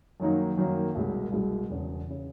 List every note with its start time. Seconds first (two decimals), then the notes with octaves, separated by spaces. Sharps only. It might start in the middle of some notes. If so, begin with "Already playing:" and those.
0.20 F#2 D#3 F#3 A#3 D#4
0.57 F#2 D#3 F#3 A#3 D#4
0.95 C2 B2 G#3
1.32 C2 B2 G#3
1.69 E1 E2 C#3
2.10 C#3